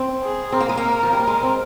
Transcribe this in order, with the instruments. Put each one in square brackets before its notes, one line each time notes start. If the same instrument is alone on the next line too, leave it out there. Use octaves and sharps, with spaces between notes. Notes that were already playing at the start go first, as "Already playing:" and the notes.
Already playing: [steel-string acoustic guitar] C4
[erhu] G#4
[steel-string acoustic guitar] C4 [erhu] A#4
[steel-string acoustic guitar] A#3
G#3
A#3
F3
G3
G#3
C4